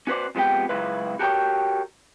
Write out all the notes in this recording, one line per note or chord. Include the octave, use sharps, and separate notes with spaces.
C#4 F#4 B4 C5 D5
F2 F3 G#3 B3 G4 G5
C#2 F#2 C#3 E4 F4 B4
F#4 G4 A4 A#4 C#5 G5